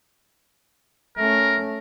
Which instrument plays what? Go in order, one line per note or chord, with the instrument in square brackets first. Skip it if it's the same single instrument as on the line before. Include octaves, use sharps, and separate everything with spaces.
[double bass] A3 C#4 [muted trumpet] A#4